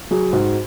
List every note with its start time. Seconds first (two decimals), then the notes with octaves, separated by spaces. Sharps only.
0.11 F#3 G#4
0.33 G#2 F#4